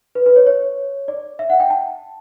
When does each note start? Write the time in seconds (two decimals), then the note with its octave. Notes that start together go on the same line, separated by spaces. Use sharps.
0.15 B4
0.26 B4
0.36 C#5
0.47 C#5
1.08 D5
1.39 E5
1.50 F#5
1.60 G5
1.70 A5